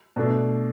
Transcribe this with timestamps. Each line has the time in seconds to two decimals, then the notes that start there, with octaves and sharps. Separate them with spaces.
0.16 B2 A3 D4